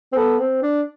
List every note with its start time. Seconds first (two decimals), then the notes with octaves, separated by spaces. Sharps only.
0.12 C4
0.16 B3 A4
0.40 C4
0.63 D4